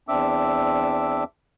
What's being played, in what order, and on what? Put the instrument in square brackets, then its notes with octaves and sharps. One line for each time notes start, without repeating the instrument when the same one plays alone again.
[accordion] E2 C4 D4 E5 D6 E6